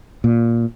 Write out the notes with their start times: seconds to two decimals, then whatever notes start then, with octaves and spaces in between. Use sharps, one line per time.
0.24 A#2